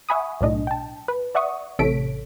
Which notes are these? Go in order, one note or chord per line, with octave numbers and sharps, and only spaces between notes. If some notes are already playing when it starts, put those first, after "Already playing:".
E5 F#5 G#5 B5 C#6 D#6
B1 A2 D4 D#5
G5 A5
B4
D5 E5 F#5 C#6 D#6
A1 C3 A4 C#5 B6 D7